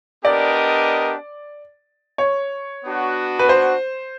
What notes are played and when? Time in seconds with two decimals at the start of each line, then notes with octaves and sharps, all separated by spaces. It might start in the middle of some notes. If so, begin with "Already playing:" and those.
0.24 B3 D4 G4 A#4 D5 D#5
2.18 C#5
2.84 B3 D4 F#4
3.39 B4
3.49 C5